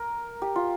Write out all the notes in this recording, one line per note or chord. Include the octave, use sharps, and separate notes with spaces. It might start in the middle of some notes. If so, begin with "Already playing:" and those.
Already playing: A#4
G4
F4